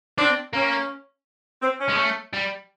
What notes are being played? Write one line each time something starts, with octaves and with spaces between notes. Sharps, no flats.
C4 D4
A#3 C#4
C4
C#4
G#3
A3
G3